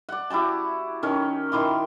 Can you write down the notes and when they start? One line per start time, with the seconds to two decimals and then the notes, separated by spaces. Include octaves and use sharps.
0.09 D5 F#5
0.30 E4 F#4 G4 A5
1.03 D#3 C#4 A#4
1.52 D#3 E4 C6 D6